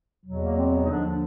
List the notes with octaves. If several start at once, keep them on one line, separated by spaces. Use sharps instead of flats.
E2 B2 F#3
A#3
C4
B3
D#4
D#2 D3 F3 D4
D4